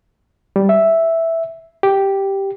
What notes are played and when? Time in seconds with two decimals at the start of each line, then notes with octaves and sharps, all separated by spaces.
0.56 G3
0.69 E5
1.83 G4